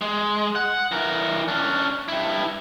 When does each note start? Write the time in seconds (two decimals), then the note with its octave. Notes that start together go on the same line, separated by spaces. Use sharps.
0.01 G#3
0.55 F#5
0.92 E3 A#4
1.48 C#4 D4
2.08 G2 E4